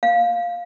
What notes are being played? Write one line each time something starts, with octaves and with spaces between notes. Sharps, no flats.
F5